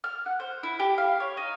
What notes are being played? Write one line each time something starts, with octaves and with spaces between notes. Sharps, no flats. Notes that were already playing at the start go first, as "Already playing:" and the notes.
F6
F#5
C5
E4
G4
F5
C#5
D#4